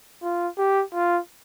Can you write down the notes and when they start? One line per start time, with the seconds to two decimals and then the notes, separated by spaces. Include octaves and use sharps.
0.23 F4
0.58 G4
0.94 F4